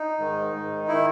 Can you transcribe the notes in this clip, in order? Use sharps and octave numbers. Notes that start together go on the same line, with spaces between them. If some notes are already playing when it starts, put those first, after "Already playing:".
Already playing: D#4
G#2 D#3
G#2 D#3
D#3 E4